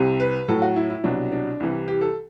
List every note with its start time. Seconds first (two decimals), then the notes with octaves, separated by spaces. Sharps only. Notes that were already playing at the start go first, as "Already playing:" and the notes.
Already playing: C2 C3 G3
0.20 B4
0.48 A2 F#3 A4
0.62 F#4
0.76 E4
0.90 E4
1.04 C2 B2 F#3 D4
1.32 D4
1.60 C2 C3 E3 G3
1.88 G4
2.01 A4